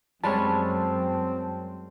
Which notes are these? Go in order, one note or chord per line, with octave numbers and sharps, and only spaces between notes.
F#2 G3 G#3 C4 C#4 A5